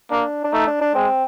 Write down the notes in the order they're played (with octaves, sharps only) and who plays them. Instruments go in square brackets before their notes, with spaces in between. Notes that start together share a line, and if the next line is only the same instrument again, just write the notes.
[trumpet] A#3 [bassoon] D4
[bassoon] D4
[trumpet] A3 [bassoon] D#4
[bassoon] D4
D4
[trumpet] G#3 [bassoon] C4